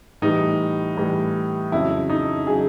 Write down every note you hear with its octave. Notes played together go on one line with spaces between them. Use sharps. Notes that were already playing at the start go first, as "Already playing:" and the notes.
A2 E3 G3 D#4
A2 E3 G3
F2 C#3 F#3 E4
D#4
C#3 F#3 G#4